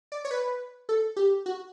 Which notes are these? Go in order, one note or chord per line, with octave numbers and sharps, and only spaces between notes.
D5
C#5
B4
A4
G4
F#4